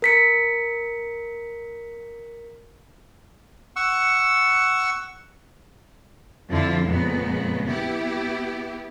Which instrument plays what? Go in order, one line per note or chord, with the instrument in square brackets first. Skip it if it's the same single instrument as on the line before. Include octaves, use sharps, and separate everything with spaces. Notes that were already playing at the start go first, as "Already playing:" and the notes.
[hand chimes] A#4 B6 C#7
[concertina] F#5 C#6 E6
[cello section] F2 D3 F3 E4 F4
F2 A#2 C#3 G#3 B3
B3 E4 G4